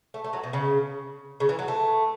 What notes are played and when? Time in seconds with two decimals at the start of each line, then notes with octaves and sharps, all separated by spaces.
0.14 A3
0.24 A3
0.33 F#3
0.44 B2
0.53 C#3
1.40 C#3
1.49 E3
1.59 F#3
1.68 A3